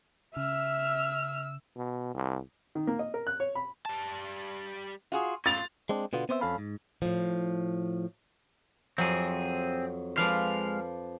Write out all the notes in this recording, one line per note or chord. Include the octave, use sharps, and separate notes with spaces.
C#3 E5 E6 F6
B2
C2
D#3
A#3
D#5
A#4
F#6
C#5
B5
G3 A5
F4 F#4 G#4
C#4 F4 E5 A6 F7
G#3 C4 D4
B2 D3 B3 F4
B3 C4 C5 D5 E5
F2 C#4 A4 F5 B5
G#2
A2 F3
F2 F#3 C4 G#4
F3 G#3 B4 D5 F5